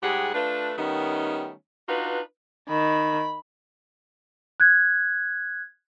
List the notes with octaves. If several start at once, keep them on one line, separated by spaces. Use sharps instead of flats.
G#2 G3 G4 G#4 F#5
A3 D4 F4 B4
D#3 G3 A3 B3 C#4 D#4
D4 D#4 F4 F#4 B4
D#3 B5
F#6 G#6